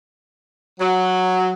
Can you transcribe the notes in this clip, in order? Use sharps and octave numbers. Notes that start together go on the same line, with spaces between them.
F#3